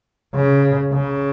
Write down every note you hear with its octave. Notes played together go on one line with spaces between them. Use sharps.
C#3
C#3